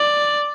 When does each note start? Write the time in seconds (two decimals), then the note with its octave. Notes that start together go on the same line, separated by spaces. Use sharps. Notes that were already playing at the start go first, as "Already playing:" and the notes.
Already playing: D5